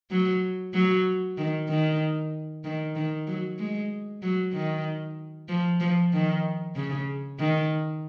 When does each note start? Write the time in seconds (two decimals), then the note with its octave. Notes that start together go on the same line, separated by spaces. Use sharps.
0.11 F#3
0.74 F#3
1.38 D#3
1.69 D#3
2.64 D#3
2.95 D#3
3.27 F#3
3.59 G#3
4.23 F#3
4.53 D#3
5.49 F3
5.80 F3
6.13 D#3
6.76 C#3
7.40 D#3